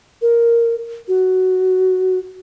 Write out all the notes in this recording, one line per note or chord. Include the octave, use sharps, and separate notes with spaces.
A#4
F#4